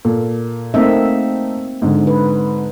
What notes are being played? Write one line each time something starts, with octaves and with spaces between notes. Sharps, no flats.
A#2 A4
A3 A#3 C4 D#4 E5
G#2 D3
B4